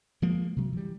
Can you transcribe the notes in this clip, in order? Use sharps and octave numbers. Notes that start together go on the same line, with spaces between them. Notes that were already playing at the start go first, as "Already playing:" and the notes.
F3 G#3 A#3
C3 F#3
E3 G3